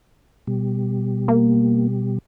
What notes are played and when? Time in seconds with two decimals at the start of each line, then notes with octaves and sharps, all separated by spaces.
0.47 B2 G3
1.28 A#3